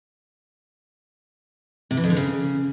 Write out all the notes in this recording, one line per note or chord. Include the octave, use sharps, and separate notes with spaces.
C3
E3
F2
D3
C#3